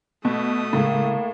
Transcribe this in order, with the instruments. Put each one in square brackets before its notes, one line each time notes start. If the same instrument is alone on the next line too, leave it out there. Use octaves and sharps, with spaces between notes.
[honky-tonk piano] B2 [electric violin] A3 D#6
[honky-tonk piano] A2 [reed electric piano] C#3 G#3 [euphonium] A#3